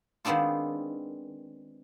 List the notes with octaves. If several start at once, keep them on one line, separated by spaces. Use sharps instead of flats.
D#3 G#3 B3 C4 D4 F4